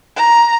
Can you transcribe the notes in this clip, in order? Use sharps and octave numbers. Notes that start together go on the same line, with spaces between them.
A#5